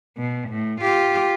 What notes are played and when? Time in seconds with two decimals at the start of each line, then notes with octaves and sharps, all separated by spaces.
0.17 B2
0.49 A2
0.81 F4 G4